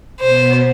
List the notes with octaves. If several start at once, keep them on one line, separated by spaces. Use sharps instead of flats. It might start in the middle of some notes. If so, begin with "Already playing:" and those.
B2 B3 C5